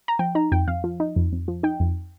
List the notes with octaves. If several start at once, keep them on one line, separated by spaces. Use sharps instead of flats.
A#5
F3 G5
D#4 A#5
F2 G5
F2 F5
F3
D#4
F2
F2
F3
D#4 G5
F2